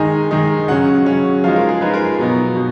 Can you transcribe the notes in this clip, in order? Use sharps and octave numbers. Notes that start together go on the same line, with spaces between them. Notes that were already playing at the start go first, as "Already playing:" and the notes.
Already playing: D#3 G#3 D#4 G#5
D#3 G#3 D#4
C#3 F#3 C#4 F#5
C#3 F#3 C#4
F3 G#3 D#4 F5
A#4
G#4
F3 G#3 D#4 B4
A#4
B2 F#3 B3 D#4
B2